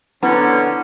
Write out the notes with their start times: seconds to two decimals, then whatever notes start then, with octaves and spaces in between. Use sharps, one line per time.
0.23 D3 B3 C#4 E4 A#5